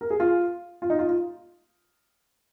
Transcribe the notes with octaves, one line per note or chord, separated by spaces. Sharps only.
A#4
G#4
F4
F4
D#4
F4
F4